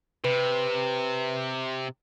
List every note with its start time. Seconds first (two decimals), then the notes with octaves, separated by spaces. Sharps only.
0.24 C3 B4